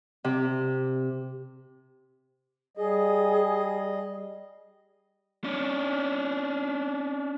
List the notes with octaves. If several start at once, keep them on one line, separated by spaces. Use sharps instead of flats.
C3
G3 G#4 D#5
C#4 D4